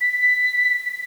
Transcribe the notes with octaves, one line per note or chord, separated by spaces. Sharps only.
B6